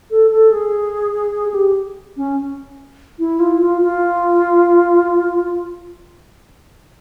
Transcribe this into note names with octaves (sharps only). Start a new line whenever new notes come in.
A4
A4
G#4
G#4
G4
C#4
E4
F4
F4
F4